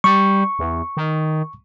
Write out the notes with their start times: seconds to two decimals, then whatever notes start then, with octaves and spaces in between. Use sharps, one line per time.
0.04 G3 C#6
0.59 E2
0.97 D#3